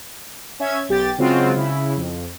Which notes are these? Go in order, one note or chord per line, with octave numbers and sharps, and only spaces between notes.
C#4 E5 G#6
B1 G4 G5 A6
C#3 F#3 G#3 C4 F4 F#4
C#3 E4
F2